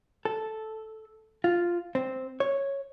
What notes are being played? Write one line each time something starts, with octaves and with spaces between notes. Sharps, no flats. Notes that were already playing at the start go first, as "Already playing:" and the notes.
A4
F4
C4
C#5